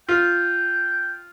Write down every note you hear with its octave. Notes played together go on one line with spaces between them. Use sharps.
F4 G5